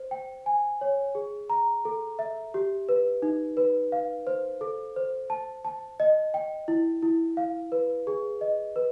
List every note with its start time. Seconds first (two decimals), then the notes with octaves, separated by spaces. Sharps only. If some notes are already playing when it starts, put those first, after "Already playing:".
Already playing: C5
0.11 G5
0.46 G#5
0.81 C#5
1.15 G#4
1.50 A#5
1.85 A4
2.19 E5
2.54 G4
2.89 B4
3.22 D#4
3.57 B4
3.92 F5
4.27 C5
4.61 A4
4.96 C5
5.30 A5
5.65 A5
6.00 D#5
6.34 G5
6.68 E4
7.03 E4
7.37 F5
7.72 B4
8.07 G#4
8.41 D#5
8.76 B4